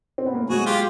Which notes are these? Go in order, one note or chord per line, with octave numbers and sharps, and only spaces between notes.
C4
B3
A#3
A3
F#3 G#3 F#4 G#4
F4 G4